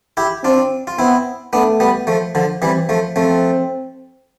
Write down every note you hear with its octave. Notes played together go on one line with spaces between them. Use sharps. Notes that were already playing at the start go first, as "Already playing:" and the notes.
E4 G4
C4 D4 F4
F4
B3 C4 E4
A3 B3 D4
G3 B3
F3 A3
D3 F3
E3 G3 C4
F3 A3
F3 A3 C4